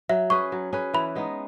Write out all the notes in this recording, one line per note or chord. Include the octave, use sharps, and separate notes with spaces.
F#3 E5
C#4 G#4 B4 C#6
F#3
C#4 G#4 B4
E3 B5
G#3 B3 D#4